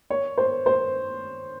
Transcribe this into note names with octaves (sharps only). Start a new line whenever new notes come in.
C#5
C5
C5